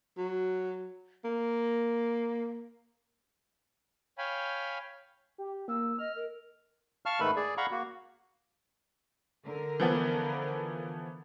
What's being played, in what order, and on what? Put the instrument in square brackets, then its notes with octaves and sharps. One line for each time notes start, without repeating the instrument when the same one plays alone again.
[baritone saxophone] F#3
A#3
[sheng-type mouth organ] C#5 F5 G5 G#5 B5
[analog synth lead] G4
[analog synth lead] A#3 [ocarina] E6
[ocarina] D#5 [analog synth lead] F6
[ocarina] A#4
[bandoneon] F5 A5 C#6 F6
G#2 D#3 A3 A4 B4 B5
G#4 D5
F5 F#5 A#5 B5 C#6
A#3 F#4
[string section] D3 A#4
[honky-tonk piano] E3 F3 B3